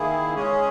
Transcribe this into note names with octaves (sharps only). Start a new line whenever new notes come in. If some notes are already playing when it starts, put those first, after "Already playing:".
Already playing: D#3 A#3 E4 G#4
C#3 G#3 C#4 G#4